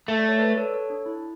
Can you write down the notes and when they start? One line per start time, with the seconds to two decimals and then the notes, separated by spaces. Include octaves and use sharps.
0.08 A3
0.19 D5
0.28 C#5
0.38 B4 D5
0.57 A4 C#5
0.74 A4 C#5
0.90 D4
1.06 E4